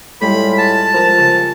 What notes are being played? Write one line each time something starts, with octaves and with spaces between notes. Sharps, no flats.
A2 G3 G#3 F4 B5
A5
F3 A#4 A#5
C#3